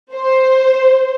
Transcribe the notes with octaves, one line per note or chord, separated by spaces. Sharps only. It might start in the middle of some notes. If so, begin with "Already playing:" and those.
C5